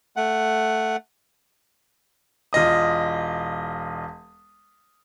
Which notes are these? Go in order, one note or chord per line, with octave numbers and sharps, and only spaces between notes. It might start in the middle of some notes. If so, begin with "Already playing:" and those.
A3 F#5
E1 F4 D#5 D#6